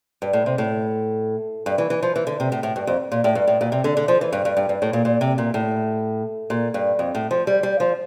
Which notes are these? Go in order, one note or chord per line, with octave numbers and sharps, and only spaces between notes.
G2
A2
C3
A2
G2
E3
E3
F3
E3
D3
C3
A2
A2
G2
F2
A#2
A2
G2
A2
A#2
C3
D3
D3
F3
E3
G2
G2
G2
G2
A2
A#2
A#2
C3
A#2
A2
A#2
G2
F2
A2
F3
G3
G3
F3